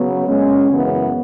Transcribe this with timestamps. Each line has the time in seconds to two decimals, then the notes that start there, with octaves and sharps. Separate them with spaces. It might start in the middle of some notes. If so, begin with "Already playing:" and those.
Already playing: C#3 F#3 B3
0.26 A#2 G#3 C#4
0.70 F#2 C#3 E3 B3